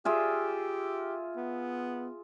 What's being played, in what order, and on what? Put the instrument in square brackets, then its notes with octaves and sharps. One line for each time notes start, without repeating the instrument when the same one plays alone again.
[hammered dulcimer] F4 G#4 E5 [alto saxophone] G4
[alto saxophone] B3